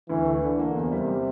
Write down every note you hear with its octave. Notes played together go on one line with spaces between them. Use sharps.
D2 E3
A3
D3 E3
A#3
E2 C3
G3